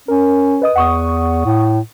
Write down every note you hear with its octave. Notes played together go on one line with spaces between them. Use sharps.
C#4 A#4
B4 D#5 D#6
E2 F#5 C#6 D#6
A2